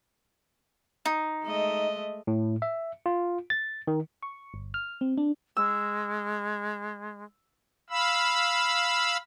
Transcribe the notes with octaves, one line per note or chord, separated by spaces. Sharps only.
D#4
G#3 A3 D#5
A2
E5
F4
A6
D#3
C#6
G1
F6
C4
D4
G#3 E6
F5 B5 E6